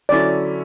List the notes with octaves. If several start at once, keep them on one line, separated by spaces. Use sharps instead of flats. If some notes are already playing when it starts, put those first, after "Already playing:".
D3 F#3 C#4 E4 D5